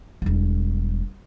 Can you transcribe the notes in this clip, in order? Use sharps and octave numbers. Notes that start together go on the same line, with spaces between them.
E1 G3